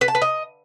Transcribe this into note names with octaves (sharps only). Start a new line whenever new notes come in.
B4
A5
B4
D#5